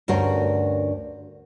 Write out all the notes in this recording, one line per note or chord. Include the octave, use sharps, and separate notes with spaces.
D2 G2 C#4 F#4 A#4 C5